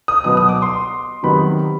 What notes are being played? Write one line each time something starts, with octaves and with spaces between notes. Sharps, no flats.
D#6
B2 F#3 B3 D#6
D#6
D6
C6
C3 D#3 F#3 B3 B5